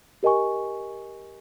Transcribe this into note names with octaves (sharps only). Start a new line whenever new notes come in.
G4 A#4 D#5 G#5 C#6